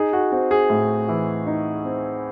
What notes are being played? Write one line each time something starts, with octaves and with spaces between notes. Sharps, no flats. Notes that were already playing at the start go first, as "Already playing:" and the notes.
Already playing: D#4 G#4
F#4
C4 F#4
G#4
A2
E3
D#4
C4